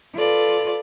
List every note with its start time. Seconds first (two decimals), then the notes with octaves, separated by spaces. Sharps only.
0.15 F4 A4 B4 D5